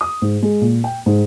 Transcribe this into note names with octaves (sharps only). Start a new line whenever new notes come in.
D#6
G#2
G#3
A#2
G5
G#2